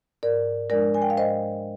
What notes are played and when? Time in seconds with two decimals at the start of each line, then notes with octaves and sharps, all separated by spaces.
0.23 G#2 A#4 D5
0.70 F3 G#3 D4 A#4 D5
0.94 G#5
1.02 G5
1.10 F5
1.17 G#2 C5 D#5